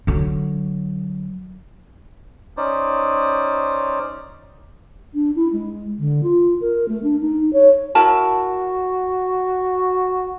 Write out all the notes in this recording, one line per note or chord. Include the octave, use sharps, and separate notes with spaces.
D3 F#3
C#4 D#4 C5 D5
D4
E4
G#3
D3
F4
A#4
A3
D4
D#4
C#5
E4 F#4 A#4 A5